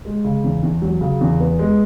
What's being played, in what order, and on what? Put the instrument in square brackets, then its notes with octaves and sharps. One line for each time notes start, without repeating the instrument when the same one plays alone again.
[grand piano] G#3
C#3
E2
E2
F#3
C#3
E2
B3
G#3